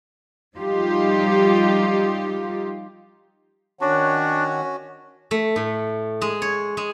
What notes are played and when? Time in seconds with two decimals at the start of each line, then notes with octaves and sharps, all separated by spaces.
0.57 F3 G3 D#4 F4 G4
3.81 D#3 C#4 D4 F#4 C#5 F#5
5.31 A3
5.56 A2
6.21 G#3
6.42 C#5
6.77 G#3